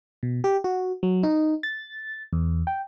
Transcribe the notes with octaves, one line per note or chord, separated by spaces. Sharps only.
B2
G4
F#4
F#3
D#4
A6
E2
G5